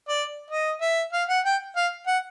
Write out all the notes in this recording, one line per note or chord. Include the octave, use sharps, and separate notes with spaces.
D5
D#5
E5
F5
F#5
G5
F5
F#5